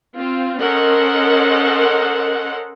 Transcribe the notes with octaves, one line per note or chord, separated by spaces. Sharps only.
C4 F4
C#4 A4 A#4 C5 D#5 F#5